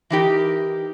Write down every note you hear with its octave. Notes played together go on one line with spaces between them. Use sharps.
E3 D#4 G4 A#4